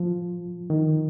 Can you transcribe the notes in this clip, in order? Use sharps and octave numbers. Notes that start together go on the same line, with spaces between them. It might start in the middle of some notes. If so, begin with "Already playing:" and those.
Already playing: F3
D#3